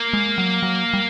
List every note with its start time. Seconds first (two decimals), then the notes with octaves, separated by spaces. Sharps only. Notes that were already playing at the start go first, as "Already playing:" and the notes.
Already playing: A#3
0.13 G#3
0.38 F#3
0.62 F#3
0.93 G3